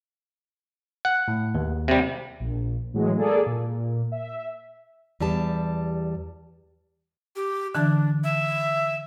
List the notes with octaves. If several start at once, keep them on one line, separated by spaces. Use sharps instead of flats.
F#5
A2
D#2
C3 G3
A#1
A2 E3 F#3 G#3
A#3 G#4 A4 D5
A#2
E5
E2 G3 G4 A5
G4
D3 E3 D4 A5
E5